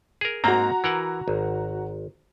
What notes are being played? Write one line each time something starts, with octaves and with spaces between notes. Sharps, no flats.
G#4 A#4
G#2 A#3 C4 F#4 A#5
E3 A#4 F#5
G#1